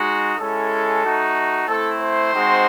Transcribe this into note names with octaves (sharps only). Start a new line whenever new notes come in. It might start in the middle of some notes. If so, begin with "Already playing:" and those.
Already playing: G#3 D#4 F#4
G#3 C#4 E4 A4
A3 D#4 F#4
A3 C4 E4 A4
C5
G#3 C4 D#4 F#4